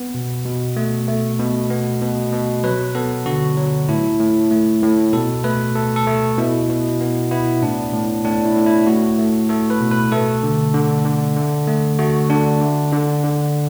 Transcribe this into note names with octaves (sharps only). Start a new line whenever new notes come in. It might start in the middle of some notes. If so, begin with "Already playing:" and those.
Already playing: B3
B2
B2
A3
A3
B2
B3
B2
B2
F#3 B4
B3 A4
D3 F#4
F#3
A2 E4
A2
A3
A2
B2 A4
A3 B4
A3 A4
A4
A3
B2 E4
B2
B3
B3 E4
A2 D4
A2
A2 D4
E4
A2
E4
A3 F#4
A3
A3 A4
B4
B2
B4
A3 A4
D3
D3
D3
D3
A3
A3 F#4
D3 D4
D3
D3
D3